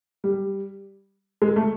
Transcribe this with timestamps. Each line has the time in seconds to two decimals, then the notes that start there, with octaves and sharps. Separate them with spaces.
0.24 G3
1.42 G#3
1.56 A3